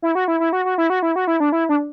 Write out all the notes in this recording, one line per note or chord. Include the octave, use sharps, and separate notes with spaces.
E4
F#4
E4
E4
F#4
F#4
E4
F#4
E4
F#4
E4
D4
E4
D4